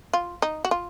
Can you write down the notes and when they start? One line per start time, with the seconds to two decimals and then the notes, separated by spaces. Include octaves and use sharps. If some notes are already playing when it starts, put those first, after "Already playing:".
0.13 F4
0.42 D#4
0.65 F#4
0.71 F4